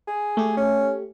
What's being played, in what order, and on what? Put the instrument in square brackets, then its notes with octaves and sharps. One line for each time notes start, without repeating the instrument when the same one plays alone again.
[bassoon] G#4
[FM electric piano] A3 G4
[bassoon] C#4